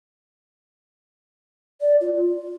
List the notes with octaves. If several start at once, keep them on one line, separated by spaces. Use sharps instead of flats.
D5
F4
F4